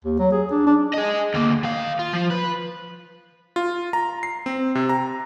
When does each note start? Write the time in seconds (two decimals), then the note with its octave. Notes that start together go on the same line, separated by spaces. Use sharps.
0.05 D#2
0.19 F#3
0.32 G#4
0.51 D4
0.66 D4
0.93 G#4 D#5
1.34 D2 A#3
1.63 D#3 F5
1.99 F4
2.13 F3
2.31 B4
3.56 F4
3.93 A#5
4.23 C7
4.46 C4
4.75 C3
4.89 A#5